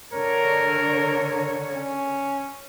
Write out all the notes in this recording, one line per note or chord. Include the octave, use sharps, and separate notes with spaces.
D3 A#4 C#5
C#4